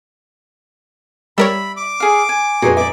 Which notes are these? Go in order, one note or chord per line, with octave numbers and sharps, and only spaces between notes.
G3 A#4 C#5 D5 E5 B5
D6
G#4 F5
G#5
F2 A#2 D#4 F#4 G#4 B4 G#5 C6
D5 E5 D6